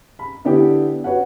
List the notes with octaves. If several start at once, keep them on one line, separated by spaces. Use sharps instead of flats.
B5
D3 B3 D4 E4 G4
F#4 B4 C#5 F#5